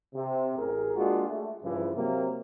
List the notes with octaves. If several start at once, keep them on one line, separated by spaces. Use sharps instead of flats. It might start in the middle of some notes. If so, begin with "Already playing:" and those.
C3
A1 G#4 A#4
G#3 A#3 D4 F4 F#4 G#4
A3
G2 C#3 E3 F3
C3 F#3 A#3